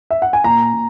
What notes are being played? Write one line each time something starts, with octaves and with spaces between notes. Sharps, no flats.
E5
F#5
G#5
A#2 A#5
A#2